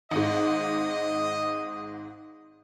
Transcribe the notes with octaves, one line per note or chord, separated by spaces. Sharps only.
G#1 G#2 D#5